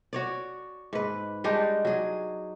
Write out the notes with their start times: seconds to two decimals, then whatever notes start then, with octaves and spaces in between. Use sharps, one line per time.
0.13 F#4 C#5 D5
0.93 G#2 B4
1.44 G3 G#3 D4 D#4
1.85 F#3 G#4